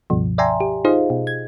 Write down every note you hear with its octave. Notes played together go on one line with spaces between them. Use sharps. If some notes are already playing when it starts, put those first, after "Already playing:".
C#2 G2 B2 F3
D5 E5 G5 G#5 A#5 C6
G4
D#4 F4 G#4 C5 D#5 F5
B2
G#6